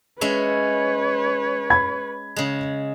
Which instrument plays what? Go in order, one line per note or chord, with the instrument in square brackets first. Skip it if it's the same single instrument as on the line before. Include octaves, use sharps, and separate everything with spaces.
[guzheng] G#3 C#4 E5 [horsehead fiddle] B4 C#5
[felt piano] B5 G#6
[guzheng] C#3 G#3